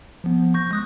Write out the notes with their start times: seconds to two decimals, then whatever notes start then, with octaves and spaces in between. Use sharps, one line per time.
0.24 F3 B3
0.54 C#6 G6 A#6
0.71 G#3 D#6 F#6